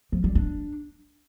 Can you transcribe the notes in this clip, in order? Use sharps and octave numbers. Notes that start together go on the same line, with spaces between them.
F3
G3
D4